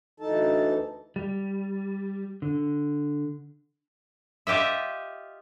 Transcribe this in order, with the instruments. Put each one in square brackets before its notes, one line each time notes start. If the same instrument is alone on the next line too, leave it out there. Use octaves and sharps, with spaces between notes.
[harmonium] D2 E3 D#4 A4 A5
[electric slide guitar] G3
D3
[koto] F4 G4 D#5 E5